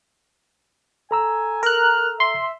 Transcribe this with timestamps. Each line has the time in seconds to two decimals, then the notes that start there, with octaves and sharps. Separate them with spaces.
1.11 A4 G#5 A#5 E6
1.63 A#4 F6 F#6
2.20 E5 C6